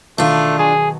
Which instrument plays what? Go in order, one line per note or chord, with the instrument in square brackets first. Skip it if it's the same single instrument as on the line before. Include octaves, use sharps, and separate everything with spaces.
[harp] B2 D#3 [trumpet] A3 [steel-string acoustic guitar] D4 F4
[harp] B1 A5 C#6 [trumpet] G#4